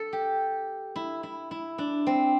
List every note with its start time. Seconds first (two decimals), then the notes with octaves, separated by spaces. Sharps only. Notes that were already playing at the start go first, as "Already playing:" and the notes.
Already playing: A4
0.13 G4
0.96 E4
1.23 E4
1.51 E4
1.78 D4
2.07 C4